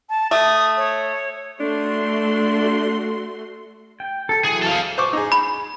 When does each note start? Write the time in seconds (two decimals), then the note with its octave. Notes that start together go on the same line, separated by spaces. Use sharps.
0.10 A5
0.31 A3 D#6
0.77 C#5
1.60 A3 D4 F#4 C6
4.00 G5
4.29 A4
4.45 E3 F#3 G#4
4.62 A4 F5
4.98 C5 C#6 D6
5.13 D#4 G#4
5.32 B5